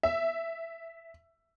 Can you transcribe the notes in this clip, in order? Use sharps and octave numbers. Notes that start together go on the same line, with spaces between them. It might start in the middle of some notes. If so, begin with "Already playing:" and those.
E5